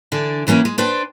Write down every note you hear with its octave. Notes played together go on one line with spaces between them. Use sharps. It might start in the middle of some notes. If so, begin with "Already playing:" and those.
D3 E3 D4
C#3 E3 A#3 C#4 F#4
G#3
D4 B4 C5 G5